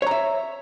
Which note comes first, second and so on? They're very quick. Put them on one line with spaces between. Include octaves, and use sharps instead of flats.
C#5 A#5 E5